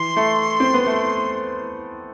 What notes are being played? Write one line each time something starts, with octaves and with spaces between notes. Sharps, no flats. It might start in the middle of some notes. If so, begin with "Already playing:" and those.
Already playing: E3 C6
A3
C4
B3
A3